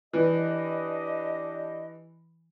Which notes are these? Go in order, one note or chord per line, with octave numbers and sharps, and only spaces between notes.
E3 D4 G4 D#5